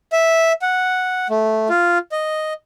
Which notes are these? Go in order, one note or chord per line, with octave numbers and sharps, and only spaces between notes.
E5
F#5
A3
F4
D#5